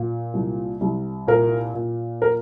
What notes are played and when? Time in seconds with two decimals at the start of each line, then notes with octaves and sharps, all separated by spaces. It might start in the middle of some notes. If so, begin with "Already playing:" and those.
Already playing: A#2
0.34 C2
0.81 C2
1.27 A#2 A#4
1.74 A#2
2.22 A#4